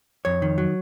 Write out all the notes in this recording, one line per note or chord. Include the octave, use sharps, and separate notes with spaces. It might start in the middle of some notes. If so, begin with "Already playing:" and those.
F2 C#5
D#3
F#3